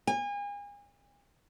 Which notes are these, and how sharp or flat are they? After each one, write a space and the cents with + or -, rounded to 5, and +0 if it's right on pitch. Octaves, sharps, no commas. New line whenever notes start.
G#5 -35